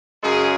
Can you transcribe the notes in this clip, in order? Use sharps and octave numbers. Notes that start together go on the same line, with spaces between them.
F#2 C#3 G#3 G#4